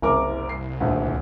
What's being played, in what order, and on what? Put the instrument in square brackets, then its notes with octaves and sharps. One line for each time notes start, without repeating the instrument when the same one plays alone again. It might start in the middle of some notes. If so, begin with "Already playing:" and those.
[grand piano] F#1 A#4 D6 [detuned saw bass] C2
[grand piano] C7
D#1 D2